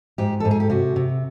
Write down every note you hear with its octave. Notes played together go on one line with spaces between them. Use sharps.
G#2 G4
G#2 A4
G#4
G4
C3 F#4
C3